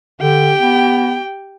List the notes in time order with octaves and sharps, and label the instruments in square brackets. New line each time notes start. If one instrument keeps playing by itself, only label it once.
[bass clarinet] D3 [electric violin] G4 G5
[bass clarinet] B3